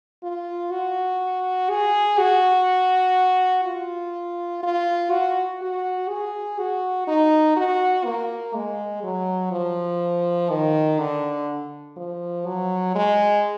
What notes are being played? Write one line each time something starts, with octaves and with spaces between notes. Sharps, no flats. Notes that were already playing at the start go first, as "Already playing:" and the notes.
F4
F#4
G#4
F#4
F4
F4
F#4
F#4
G#4
F#4
D#4
F#4
A#3
G#3
F#3
F3
D#3
D3
F3
F#3
G#3